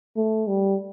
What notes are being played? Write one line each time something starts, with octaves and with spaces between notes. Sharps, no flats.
A3
G3